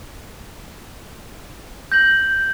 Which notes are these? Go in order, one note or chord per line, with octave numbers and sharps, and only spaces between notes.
G6 A#6 F#7